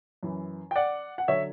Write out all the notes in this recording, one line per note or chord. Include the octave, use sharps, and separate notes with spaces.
F#2 E3
G5
D5 F#5
F#5
D3 F#3 C#5 E5